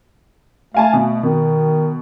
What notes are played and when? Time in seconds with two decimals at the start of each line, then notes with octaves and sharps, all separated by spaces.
0.74 A3 F5 G#5 A5
0.93 B2
1.23 B2 D#3